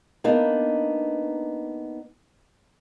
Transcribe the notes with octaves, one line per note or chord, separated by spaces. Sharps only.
A#3 B3 D4 D#4